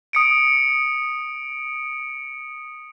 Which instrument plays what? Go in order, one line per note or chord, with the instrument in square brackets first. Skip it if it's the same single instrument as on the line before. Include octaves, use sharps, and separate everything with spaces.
[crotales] D#6 C#7 D7